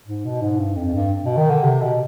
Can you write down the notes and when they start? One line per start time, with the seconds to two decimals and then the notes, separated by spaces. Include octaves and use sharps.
0.06 G#2
0.25 B2
0.42 G#2
0.59 G2
0.76 F2
0.95 G2
1.25 B2
1.37 D#3
1.50 D3
1.63 C3
1.81 B2